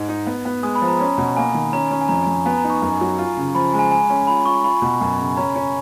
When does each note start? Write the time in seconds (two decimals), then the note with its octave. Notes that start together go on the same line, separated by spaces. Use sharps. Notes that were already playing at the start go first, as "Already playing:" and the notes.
Already playing: G#2
0.09 D#4
0.27 B3
0.45 B3
0.63 G#3 D#6
0.75 B5
0.82 F3
0.88 A#5
1.00 C#4 A#5
1.18 B2
1.37 A#3 G#5
1.54 D#3
1.73 C#4 A#5
1.91 C#4
2.01 G#5
2.09 F2 A#5
2.27 F2
2.46 B3 G#5
2.58 A#5
2.64 D#4
2.70 C#6
2.82 F#2
3.01 F#3
3.18 F4
3.37 C#3
3.55 F3 B5
3.73 G#3
3.79 G#5
3.91 G#3 G#5
4.10 C#4
4.27 F4 B5
4.46 F4 C#6
4.64 F4 B5
4.82 B2
5.01 F#2
5.19 C#3
5.37 C#4 A#5
5.56 C#4